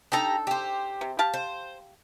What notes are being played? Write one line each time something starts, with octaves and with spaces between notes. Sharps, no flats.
D4 D#4 G4 A4 A#5
G4 C5
C3
G4 F5 A5
C5